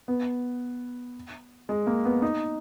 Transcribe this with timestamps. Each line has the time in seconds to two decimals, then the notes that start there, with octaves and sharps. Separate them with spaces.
0.08 B3
1.69 G#3
1.87 A#3
2.05 B3
2.22 D#4